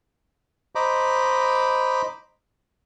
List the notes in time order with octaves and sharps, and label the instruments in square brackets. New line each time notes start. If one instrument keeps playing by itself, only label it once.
[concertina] C5 D#5 A#5 B5 D6